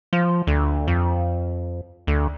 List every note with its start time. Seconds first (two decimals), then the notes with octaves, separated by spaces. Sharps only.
0.13 F3
0.47 D2
0.87 F2
2.07 D2